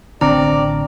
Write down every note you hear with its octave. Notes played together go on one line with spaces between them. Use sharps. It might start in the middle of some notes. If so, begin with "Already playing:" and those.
A1 D3 C4 D4 D5 A#5